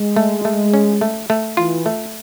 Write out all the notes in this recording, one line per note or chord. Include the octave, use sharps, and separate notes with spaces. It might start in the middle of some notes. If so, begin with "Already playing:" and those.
Already playing: G#3
A3
A3
C#4
A3
A3
E3 F4
A3